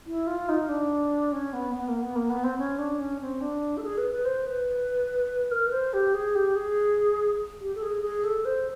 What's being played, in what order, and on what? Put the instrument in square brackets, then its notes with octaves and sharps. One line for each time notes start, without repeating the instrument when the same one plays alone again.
[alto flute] E4
F4
D#4
D4
C#4
B3
B3
A#3
B3
A#3
B3
C4
C#4
D4
C#4
C4
D4
A4
G#4
B4
B4
C5
B4
A#4
B4
C5
G4
G#4
G4
G#4
G4
A4
G#4
G#4
A4
C5